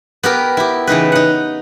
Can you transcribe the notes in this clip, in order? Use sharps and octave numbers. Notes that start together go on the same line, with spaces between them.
B3 G4 A#4
E4 G4
C#3 E3 D#4 B4
D#4 F#5